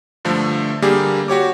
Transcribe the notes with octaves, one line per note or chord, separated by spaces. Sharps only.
G2 D3 F3 A3
D3 G3 A#3 G4 G#4 A#4
F#4 G4 C#5 D6